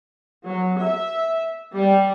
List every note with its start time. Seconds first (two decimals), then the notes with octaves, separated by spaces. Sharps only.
0.44 F#3
0.80 E5
1.74 G3